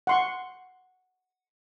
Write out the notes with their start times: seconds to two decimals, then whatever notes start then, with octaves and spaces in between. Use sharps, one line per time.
0.07 F#5 C6 C#6